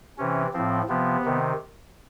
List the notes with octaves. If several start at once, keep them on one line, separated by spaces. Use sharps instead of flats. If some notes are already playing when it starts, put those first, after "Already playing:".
C3 E3 C#4
A2 F3 C4
C3 F3 B3
C3 D#3